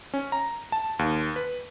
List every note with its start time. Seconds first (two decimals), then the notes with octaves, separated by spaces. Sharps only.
0.14 C#4
0.32 A#5
0.72 A5
0.99 D#2
1.36 B4